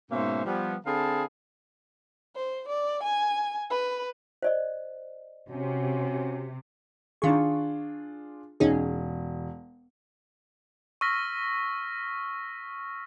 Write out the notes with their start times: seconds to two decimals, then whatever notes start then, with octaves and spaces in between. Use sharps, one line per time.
0.11 G#2 B2 A#3 C#4 C5 E5
0.45 F3 G3 B3
0.86 D3 C4 G#4 F5 A5 B5
2.36 C5
2.68 D5
3.03 G#5
3.70 B4
4.42 C5 D5 D#5
5.49 C3 C#4 F#4
7.22 D#3 D4 F4 G#4 C#6
8.60 E1 C#4 D#4 G#4
11.01 C#6 E6 F6 A#6 B6